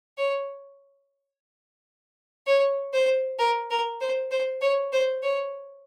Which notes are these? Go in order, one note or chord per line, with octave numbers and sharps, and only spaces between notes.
C#5
C#5
C5
A#4
A#4
C5
C5
C#5
C5
C#5